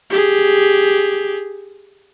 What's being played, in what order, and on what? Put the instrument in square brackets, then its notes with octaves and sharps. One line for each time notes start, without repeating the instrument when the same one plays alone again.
[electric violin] G4 G#4